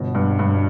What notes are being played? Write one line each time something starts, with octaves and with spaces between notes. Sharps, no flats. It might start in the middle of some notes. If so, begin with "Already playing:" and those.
Already playing: G1 B2
G2
G2